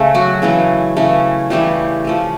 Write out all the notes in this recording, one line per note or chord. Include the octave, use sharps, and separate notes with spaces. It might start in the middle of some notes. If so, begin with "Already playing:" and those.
Already playing: C#3 A3 C#4
F#3 F#4
C#3 E3 A3 C#4
C#3 E3 A3 C#4
C#3 E3 G3 A3 C#4 G4
F3 A3 C#4